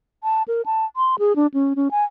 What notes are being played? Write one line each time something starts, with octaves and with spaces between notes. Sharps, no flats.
A5
A#4
A5
C6
G#4
D4
C#4
C#4
G#5